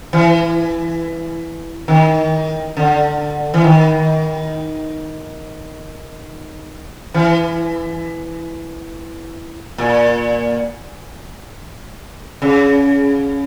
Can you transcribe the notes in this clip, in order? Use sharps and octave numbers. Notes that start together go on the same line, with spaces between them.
E3
D#3
D3
E3
D#3
E3
A#2
C#3